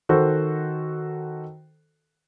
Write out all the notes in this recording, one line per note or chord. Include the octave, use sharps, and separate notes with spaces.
D#3 F#4 A4 C5